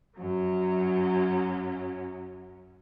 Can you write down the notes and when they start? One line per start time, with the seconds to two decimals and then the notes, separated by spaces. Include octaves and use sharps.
0.18 F#2 F#3 C#4